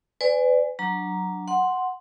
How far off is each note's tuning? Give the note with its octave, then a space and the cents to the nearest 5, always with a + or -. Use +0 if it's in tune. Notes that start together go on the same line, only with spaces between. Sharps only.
B4 +35 D5 +0 G#5 +0
F#3 +0 D4 +0 A#5 +0
F#5 +0 C6 +0